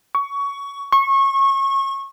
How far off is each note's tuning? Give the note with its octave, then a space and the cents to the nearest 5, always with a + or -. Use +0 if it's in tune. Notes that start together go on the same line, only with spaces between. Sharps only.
C#6 +20
C#6 -25